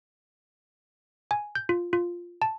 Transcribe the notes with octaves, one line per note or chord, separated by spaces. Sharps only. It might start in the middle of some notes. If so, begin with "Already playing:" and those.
G#5
G6
F4
F4
A5